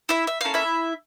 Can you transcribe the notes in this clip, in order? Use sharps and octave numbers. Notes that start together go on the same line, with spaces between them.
E4 E5
E5
A#3 C#4 E4 A4 F5
E4 E5